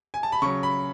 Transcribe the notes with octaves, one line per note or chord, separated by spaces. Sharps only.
G#5
A5
B5
C#3 F#3 C#6
B5